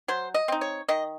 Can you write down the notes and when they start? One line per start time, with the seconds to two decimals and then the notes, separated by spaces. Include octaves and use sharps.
0.08 F#3 C5
0.34 D#5
0.48 C4 D#4
0.61 C#5
0.88 D#3 D#5